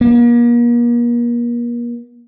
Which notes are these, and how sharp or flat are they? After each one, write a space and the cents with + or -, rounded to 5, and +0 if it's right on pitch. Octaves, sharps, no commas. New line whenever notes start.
A#3 +40